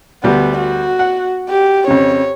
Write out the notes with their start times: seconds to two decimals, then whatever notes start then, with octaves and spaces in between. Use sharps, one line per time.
0.24 D2 G3 B3
0.57 F#4
0.99 F#5
1.50 G4
1.88 F2 C#3 C#5